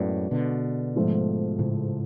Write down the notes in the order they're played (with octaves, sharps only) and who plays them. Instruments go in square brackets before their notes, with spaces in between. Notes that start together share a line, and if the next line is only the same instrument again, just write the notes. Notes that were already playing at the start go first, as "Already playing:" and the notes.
Already playing: [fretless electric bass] F#2 A2 [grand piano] G#3 B3 F#4 B4 D5
[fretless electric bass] B2 D3
[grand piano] G#2 F3 A3 F4
[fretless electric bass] A2 C#3